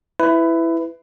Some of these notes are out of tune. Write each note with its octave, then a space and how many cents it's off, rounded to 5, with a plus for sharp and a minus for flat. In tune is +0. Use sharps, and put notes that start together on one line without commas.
E4 +5 B4 +20